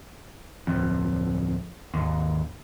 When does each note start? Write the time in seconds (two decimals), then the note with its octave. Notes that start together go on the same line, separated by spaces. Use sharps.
0.67 D1 F2
1.94 G#1 D#2